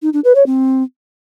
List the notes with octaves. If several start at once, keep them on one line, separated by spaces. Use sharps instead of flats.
D#4
D4
B4
C#5
C4